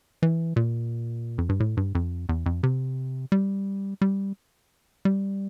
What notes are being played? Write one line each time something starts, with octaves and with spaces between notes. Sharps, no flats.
E3
A#2
F2
G2
A2
G2
F2
E2
F2
C3
G3
G3
G3